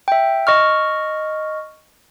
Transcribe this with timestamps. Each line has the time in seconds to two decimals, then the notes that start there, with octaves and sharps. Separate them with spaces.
0.08 E5 G5
0.47 D#5 C#6 F6